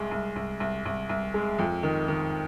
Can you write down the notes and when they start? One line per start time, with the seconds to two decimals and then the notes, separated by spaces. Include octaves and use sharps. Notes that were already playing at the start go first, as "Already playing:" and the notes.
Already playing: C2 G#3
0.11 C2
0.36 C2
0.60 C2
0.85 C2
1.09 C2
1.34 G#3
1.59 F2
1.83 D#3
2.08 D#3